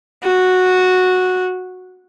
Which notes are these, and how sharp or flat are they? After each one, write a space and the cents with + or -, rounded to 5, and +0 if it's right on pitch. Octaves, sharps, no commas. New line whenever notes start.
F#4 -10